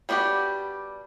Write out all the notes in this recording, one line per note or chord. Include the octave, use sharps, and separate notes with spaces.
G3 B3 D4 F#4 G4